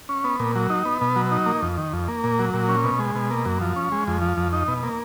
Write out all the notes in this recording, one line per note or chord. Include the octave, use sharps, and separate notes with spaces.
C#4
B3
A#2
F#3
D#4
B3
B2
F#3
D#4
A#3
F2
D#3
F2
A#3
A#2
F#3
A#2
C#4
B2
G#3
B2
A#3
F#2
F3
C#4
G#3
F2
F3
F2
D#4
B2
A#3